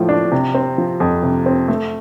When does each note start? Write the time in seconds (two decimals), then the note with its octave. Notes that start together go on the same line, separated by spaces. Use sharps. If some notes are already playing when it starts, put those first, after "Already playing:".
Already playing: A2 F3
0.09 D4
0.31 C3
0.54 C4
0.78 F3
1.00 F2
1.23 C3
1.46 C4
1.68 A3